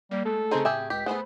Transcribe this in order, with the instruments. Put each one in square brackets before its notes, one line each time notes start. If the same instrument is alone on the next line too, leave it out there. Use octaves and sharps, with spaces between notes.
[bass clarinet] G3 [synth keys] A#3
[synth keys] G#3 A3 [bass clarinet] A4
[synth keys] C#3 C4 G#4 [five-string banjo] D#4 C5
[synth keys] A2 [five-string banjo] G4 G#4 E5
[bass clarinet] C#2 [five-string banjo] G4 [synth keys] B6
[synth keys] A3 C5 B5 [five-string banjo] B3 F#5 [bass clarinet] G#4